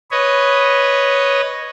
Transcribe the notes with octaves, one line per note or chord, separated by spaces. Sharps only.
B4 C#5 D#5